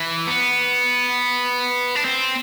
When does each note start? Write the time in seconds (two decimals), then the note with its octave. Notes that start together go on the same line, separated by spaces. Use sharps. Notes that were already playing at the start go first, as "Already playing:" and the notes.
Already playing: E3
0.27 B3
1.95 D4
2.05 C4